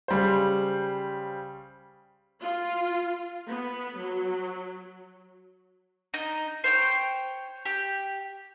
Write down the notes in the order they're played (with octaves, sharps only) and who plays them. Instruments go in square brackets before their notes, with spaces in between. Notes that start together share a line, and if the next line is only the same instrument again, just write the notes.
[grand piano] C#3 G3 C5
[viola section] F4
B3
F#3
[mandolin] D#4
C5 C#5 G5
G4